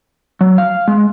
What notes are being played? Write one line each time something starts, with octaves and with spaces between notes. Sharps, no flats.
F#3
F5
G#3